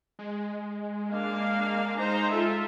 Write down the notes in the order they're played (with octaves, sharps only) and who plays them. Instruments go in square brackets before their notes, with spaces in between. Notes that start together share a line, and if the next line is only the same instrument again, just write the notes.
[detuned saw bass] G#3
[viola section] A#3 D4 F5
D#4 C5 A#5
F4 A4 E5